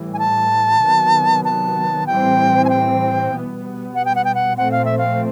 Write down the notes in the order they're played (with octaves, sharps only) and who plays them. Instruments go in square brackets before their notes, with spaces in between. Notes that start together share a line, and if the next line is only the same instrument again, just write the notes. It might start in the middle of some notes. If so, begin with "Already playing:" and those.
Already playing: [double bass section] A2 E3 G3
[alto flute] G#5
A5
[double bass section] C3 D#3 F#3 B3
[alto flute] A5
[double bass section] A2 E3 G3 C4 [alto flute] G5
[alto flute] G#5
G5
[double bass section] B2 G3 B3
[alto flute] F#5
G5
F#5
G5
F#5
[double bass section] A#2 F3 A3 C4 [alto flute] F#5
[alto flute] F5
E5
F5